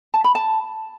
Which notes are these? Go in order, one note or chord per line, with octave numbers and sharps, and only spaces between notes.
A5
B5
A5